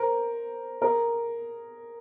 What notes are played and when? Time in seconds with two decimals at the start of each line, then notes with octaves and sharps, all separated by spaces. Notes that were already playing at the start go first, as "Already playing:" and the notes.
Already playing: A#4 C5
0.82 G#4 A#4